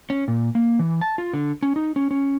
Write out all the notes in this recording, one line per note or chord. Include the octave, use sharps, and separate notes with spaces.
C#4
A#2
A#3
E3
A5
F4
D3
C#4
D#4
C#4
C#4